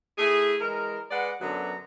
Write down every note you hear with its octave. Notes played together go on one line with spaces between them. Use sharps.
A3 E4 G#4
E3 G#3 A#4
G#3 B4 D5 F#5
F#2 D3 F#3 B3 A#5